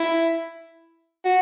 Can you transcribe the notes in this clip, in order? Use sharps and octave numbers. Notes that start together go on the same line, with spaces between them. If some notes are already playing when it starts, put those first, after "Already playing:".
Already playing: E4
F#4